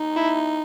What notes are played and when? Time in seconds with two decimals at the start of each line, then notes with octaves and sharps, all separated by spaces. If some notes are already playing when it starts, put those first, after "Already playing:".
Already playing: D#4
0.16 E4